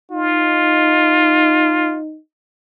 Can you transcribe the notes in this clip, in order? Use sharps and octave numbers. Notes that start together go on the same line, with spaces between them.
D#4 F4